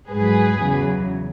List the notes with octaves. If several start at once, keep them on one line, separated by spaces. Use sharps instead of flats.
G#2 F#3 G#4 B4
E2 C#3 F#3